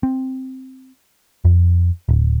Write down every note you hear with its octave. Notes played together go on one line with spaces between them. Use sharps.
C4
F2
D1